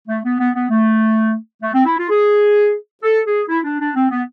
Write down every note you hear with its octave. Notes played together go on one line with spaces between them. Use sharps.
A3
B3
B3
B3
A3
A3
C4
E4
F4
G#4
A4
G#4
E4
D4
D4
C4
B3